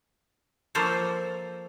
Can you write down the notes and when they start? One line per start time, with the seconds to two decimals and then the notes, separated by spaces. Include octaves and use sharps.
0.75 F3 A#3 A4 C5 C#5